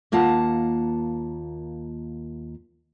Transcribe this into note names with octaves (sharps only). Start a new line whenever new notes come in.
D#2 A#3 F4 F#5 A5